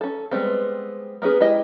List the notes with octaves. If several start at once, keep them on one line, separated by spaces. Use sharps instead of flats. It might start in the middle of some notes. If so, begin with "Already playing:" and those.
C#4 A4
G3 G#3 B3 C4
A#3 B3 C#4 G#4
G#3 E4 G4 D#5